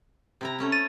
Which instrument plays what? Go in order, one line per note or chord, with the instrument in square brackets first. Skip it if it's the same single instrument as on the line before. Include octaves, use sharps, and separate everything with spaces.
[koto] C3 E4 A#5
A3 C#4 A#5
[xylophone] A6 D#7